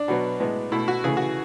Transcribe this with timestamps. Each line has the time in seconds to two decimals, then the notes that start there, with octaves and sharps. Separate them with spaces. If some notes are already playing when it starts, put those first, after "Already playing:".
Already playing: D4
0.08 B2 F#3 B3
0.40 A2 G#3 B3
0.72 B2 A3 E4
0.88 F#4
1.04 C#3 E3 A3 G#4
1.17 F#4